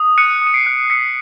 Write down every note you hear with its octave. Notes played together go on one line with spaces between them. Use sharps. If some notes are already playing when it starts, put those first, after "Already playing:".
Already playing: D#6
F#6 C#7 D#7
D#6
D#7
C7 D7
F#6
E6 B6 C#7